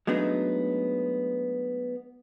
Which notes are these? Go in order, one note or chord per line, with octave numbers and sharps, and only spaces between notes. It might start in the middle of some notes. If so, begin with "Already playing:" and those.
F#3 G#3 A3 B3 D4 D#4